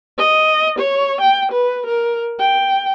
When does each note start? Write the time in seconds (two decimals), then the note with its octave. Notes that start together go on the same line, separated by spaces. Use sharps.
0.18 D#5
0.79 C#5
1.21 G5
1.52 B4
1.86 A#4
2.40 G5